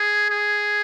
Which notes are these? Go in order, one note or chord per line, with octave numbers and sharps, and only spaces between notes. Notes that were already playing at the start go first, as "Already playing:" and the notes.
Already playing: G#4
G#4